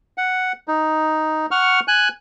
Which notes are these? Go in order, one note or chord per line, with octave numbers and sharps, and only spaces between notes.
F#5
D#4
F#5 C#6 F6
G#5 F#6